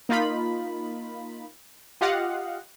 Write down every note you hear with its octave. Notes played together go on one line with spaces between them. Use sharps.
A#3 D#4 F4 B5
F4 G4 D#5 F5 F#5